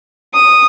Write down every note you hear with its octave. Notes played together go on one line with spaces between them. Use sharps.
D#6